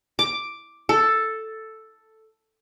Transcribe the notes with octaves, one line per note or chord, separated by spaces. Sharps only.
D6
A4